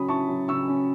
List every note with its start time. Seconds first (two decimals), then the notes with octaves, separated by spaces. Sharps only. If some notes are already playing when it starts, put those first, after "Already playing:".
Already playing: C#3 F#3 C#4 B5 D#6
0.08 E4 A5 C#6
0.29 F#3
0.48 C#3 C#6 E6
0.68 C#4